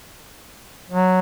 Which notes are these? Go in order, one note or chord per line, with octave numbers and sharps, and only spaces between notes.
F#3